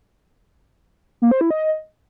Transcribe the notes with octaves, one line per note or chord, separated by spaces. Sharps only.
A#3
C5
E4
D#5